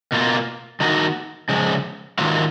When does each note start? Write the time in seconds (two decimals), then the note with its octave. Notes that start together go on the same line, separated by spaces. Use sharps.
0.12 B2 A#3 F4
0.80 D#3 A#3 D#4 F#4
1.49 C#3 F3 G#3
2.19 G#2 D#3 F#3 A#3 F4